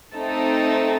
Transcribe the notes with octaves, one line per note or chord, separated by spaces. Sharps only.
A3 C4 D#4 A4